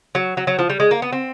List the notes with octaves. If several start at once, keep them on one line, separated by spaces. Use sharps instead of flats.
F#3
F#3
F#3
F3
G3
G#3
A#3
B3
C4